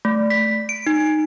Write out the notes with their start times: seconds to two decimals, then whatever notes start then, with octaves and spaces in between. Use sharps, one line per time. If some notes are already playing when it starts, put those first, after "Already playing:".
0.05 A3
0.30 B6
0.69 D7
0.87 D#4